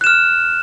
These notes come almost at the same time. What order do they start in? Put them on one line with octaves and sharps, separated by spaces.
F#6 E7 F6